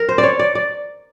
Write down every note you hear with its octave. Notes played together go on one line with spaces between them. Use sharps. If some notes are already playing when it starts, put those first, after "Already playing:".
Already playing: A#4
C5
D5
C#5
D5
D5